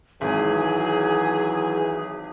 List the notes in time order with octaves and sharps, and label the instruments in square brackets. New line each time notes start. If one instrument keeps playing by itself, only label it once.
[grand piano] G#1 [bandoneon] E3 F#3 [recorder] G#4